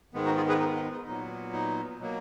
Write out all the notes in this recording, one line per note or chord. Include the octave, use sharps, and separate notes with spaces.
G#2 D#3 G#3 B3
D#4 F#4
F4 G#4
G#4 B4
D#4
D#4
D#4
A#2 F#3 B3 D#4
D#4
B2 F#3 A#3